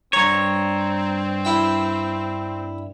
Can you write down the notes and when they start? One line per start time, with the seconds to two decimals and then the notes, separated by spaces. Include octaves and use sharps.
0.13 G2 C4 C#5 A#5
1.45 E4 G5